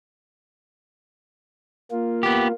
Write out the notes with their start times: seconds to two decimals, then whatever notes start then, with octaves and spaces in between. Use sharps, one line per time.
1.91 A#3 F4
2.23 B3 G4